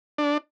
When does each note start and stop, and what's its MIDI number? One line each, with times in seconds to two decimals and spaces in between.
0.18 0.38 62